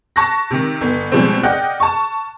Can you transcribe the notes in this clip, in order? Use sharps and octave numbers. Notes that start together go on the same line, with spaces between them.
A5 C#6 F#6 A#6
C3 D#3
G1 B3
B2 F3 G3 G#3 C4
D5 D#5 F#5 G5 F6 F#6
A5 C#6